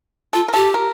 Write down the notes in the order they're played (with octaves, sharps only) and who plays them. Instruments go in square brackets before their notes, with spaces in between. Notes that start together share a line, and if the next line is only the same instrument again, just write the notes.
[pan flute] F4 [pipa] A4
[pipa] A#4
[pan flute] G4 [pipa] A4
[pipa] A#4